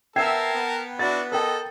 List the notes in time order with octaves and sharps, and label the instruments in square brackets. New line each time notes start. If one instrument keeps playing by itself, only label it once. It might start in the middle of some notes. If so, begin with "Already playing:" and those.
[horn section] B3 E5 [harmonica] A#4 A5 [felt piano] G5 G#6 C7
[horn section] B3
[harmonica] D4 E4 F#4 [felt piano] A6
[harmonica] A4 D#5 [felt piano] A#4 G5